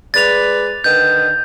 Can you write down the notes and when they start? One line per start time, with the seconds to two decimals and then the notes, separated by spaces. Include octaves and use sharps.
0.14 G#3 B4 D5 A6 F7
0.84 D3 D#3 B4 G6